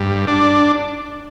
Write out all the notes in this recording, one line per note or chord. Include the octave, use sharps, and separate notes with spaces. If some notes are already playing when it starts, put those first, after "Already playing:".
Already playing: G2
D4